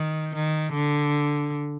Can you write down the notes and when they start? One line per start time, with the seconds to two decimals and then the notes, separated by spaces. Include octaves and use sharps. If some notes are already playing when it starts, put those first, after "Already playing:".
Already playing: D#3
0.35 D#3
0.73 D3